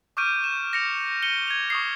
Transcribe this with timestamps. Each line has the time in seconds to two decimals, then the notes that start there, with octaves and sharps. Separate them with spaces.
0.17 C#6 D6 F6 G6 D7 D#7
0.44 E7
0.73 A#6 C#7 F7
1.23 C#7 D#7 G7
1.48 G#6 F7
1.70 C#6 D#6 C7